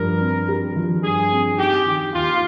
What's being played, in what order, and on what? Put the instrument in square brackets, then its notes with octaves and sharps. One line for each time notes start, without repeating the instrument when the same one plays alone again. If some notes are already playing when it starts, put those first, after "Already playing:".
Already playing: [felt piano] G2 F3 [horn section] A#4
[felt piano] C4
G4
F3
[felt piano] G2 [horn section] G#4
[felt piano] C4
[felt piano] D#4 [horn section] G4
[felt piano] D#3
[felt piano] D#2 [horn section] F4